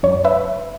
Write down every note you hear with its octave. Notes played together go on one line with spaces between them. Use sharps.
F#2 C#5
B4 E5